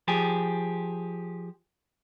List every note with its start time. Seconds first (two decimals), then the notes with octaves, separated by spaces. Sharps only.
0.08 F3 G4 G#4